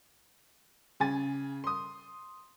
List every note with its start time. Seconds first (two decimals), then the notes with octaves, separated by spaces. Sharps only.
1.00 C#3 G#5 A6
1.64 C6 D#6